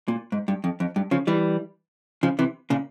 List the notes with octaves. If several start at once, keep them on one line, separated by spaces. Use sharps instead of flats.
A#2
G#2
G2
F2
F2
G2
C#3 F3
E3 G3
C#3 F3
C3 E3
A#2 C#3